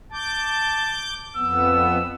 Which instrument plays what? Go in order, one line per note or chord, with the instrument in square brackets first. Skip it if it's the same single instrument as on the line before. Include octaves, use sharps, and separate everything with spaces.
[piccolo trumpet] A5 [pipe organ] D6 G6
[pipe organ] F2 B3 [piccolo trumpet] E6